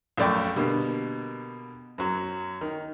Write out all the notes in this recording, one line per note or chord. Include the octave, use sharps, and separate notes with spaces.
A#1 F#2 A3 D5 G5 C#6
B2 D3 G3 A#3
F#2 F#3
D#3